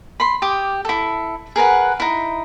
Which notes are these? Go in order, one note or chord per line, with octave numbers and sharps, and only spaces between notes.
B5 C6
G4 D6 D#6
E4 A4
G#4 A#4 B4 F#5
D#4 E4